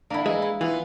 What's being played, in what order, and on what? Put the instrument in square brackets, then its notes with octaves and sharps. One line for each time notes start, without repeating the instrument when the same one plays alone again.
[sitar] D3 D4 [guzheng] A#3 E4
[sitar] E3 [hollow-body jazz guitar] G#3
[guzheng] E4
[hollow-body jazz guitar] E3 [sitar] B3 F4